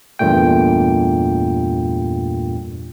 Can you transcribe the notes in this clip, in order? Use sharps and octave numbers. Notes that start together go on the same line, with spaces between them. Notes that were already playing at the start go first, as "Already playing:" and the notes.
E2 G2 A#2 A3 G5